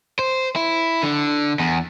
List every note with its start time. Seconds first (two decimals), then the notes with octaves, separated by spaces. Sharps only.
0.19 C5
0.56 E4
1.02 D3
1.59 E2